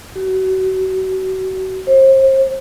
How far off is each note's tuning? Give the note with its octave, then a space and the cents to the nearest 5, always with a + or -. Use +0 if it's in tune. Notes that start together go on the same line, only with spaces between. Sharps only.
F#4 +35
C5 +35